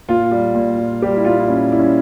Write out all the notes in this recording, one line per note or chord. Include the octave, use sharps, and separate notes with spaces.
A#2 F4
G3
A#2
G3
G3 G4
E4
A#2 F4
E4
A#2 C#4
G3 E4
C#4